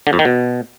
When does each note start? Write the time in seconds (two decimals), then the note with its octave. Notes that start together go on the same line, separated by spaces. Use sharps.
0.07 D3
0.13 F2
0.19 D#3
0.25 B2